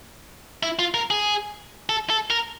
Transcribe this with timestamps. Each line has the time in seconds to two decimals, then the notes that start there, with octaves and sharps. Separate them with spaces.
0.63 E4
0.79 F4
0.94 A#4
1.10 G#4
1.89 A4
2.10 A4
2.30 A#4